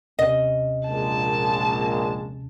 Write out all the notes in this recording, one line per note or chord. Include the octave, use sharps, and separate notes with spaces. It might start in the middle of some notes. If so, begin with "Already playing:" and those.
D#2 C3 C#4 D#5
A#1 A#2 G#3 A5